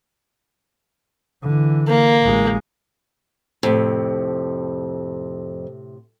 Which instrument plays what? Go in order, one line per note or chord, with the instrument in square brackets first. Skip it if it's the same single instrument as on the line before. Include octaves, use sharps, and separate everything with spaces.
[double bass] D3 E3
[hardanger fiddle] A#3
[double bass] A1 G#3
[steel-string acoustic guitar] F2 [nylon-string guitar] A2 C3